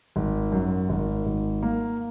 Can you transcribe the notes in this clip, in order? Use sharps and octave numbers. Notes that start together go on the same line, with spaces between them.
G#1
F#2
G#1
G#1
A#3